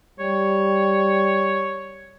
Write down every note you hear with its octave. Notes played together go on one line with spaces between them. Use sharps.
G3 C#5